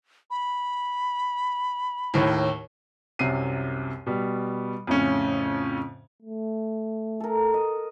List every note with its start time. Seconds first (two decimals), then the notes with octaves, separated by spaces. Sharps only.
0.31 B5
2.14 D#2 A2
3.19 C2 F#2 C3 C7 D#7
4.06 B2 G3
4.87 F2 A2 C#3 C#4
6.22 A3
7.20 A4 A#4
7.54 D#5